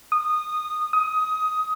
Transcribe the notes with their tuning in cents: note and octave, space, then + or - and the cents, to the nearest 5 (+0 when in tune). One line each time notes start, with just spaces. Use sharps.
D#6 -20
D#6 +15